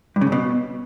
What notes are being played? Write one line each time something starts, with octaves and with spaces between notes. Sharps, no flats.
G2
C#3
G2
B2